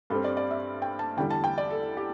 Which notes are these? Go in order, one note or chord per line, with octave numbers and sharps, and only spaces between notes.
G2 G3 C4 A4
D5
D5
E5
G5
A5
E2 D3 G3 G5
A5
G5
D5
A4
G4